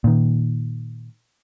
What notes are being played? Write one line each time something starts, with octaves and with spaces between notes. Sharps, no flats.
A#2 D#3